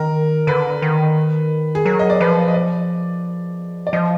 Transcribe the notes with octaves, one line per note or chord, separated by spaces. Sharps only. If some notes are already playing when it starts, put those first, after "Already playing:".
Already playing: D#3 A#4
D3 B4
D#3
G#4
F#3 A#4
D#5
D5
F3 B4
D#5
D5
D5
F3 D#5